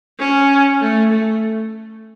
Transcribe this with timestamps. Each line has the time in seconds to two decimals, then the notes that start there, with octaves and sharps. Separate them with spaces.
0.18 C#4
0.81 A3
1.11 A3